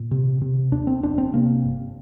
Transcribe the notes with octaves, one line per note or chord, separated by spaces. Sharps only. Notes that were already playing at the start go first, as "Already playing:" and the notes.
Already playing: A#2
C3
C3
D#2 D4
C4
F1 D4
C4
C3 A#3
G1